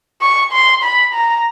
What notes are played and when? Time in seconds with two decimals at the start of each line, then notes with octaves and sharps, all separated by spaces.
0.22 C#6
0.52 C6
0.83 B5
1.14 A#5